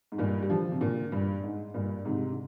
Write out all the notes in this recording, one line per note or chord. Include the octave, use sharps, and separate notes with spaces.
G#2
G2 A#2
G3
D3 F3
C3
A#2 D3
G2
G#2
G2 A#2
G#2 C3
D3